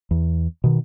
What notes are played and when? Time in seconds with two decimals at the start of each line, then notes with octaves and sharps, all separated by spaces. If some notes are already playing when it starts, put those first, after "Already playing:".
0.11 E2
0.64 B2 D#3